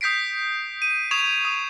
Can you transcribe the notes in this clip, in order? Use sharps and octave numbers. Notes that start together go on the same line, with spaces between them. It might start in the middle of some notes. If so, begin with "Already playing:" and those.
D#6 G6 B6 C7 D7
D#7
C#6 D#6 G#6 E7 F7
D#6